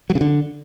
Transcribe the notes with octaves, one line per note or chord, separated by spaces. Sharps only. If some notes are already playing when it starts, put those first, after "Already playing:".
F#3
C#3
D3